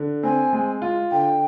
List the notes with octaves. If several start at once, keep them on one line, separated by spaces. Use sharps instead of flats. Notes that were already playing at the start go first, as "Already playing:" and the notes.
Already playing: D3
C4 G#5
G#3
F4
D3 G5